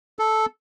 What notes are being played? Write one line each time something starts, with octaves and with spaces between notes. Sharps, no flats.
A4